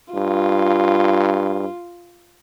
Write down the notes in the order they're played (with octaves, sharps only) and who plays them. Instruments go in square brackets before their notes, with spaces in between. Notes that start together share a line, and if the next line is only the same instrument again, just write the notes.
[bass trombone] G2 [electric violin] F4